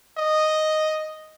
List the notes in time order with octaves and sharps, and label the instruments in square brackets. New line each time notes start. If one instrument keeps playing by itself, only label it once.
[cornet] D#5